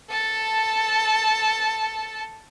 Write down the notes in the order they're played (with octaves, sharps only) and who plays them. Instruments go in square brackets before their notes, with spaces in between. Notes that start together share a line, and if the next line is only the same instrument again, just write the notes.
[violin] A4 A5